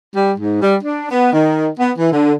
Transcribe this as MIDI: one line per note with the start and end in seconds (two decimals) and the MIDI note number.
0.16 0.32 55
0.38 0.60 44
0.62 0.76 55
0.83 1.07 62
1.11 1.30 59
1.32 1.69 51
1.79 1.92 59
1.98 2.11 52
2.13 2.34 50